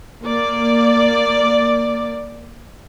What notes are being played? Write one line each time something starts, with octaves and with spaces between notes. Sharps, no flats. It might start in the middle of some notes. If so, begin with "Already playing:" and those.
A#3 D5